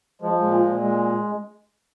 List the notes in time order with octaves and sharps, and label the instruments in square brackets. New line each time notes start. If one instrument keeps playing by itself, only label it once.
[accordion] F3 G#3
A#2 G#3
A#2
G#3